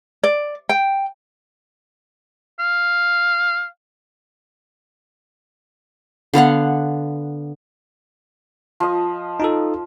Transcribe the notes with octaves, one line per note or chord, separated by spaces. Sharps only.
D5
G5
F5
D3 B3 F5 F#5
F3 D#5
D#4 F4 A4